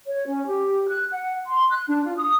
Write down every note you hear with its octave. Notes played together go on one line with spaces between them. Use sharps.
C#5
C#4
G4
F#6
F#5
C6
F#6
D4
F4
D#6